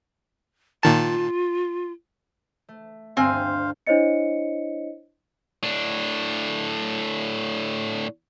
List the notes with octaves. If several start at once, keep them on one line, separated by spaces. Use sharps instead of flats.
A#2 D#3 F4 A5
A3
G1 D2 G2 C4 C5 F5 G#5
D4 E4 C5 C#5 D#5 C#7
A2 D4